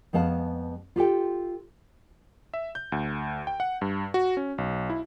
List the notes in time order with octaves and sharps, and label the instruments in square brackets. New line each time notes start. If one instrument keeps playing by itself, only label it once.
[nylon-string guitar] F2 G#3 B3 F5 A5
F4 G4 A4 G5
[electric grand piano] E5
G6
D2
G5
F#5
G2
F#4
C#4
B1
E4